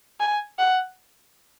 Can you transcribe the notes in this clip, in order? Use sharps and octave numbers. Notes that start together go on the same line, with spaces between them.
G#5
F#5